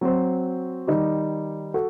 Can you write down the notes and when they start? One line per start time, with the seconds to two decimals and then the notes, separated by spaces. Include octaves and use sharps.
0.01 F#3 C4 F#4 C5
0.87 D#3 G3 D#4 G4
1.74 F#4 A4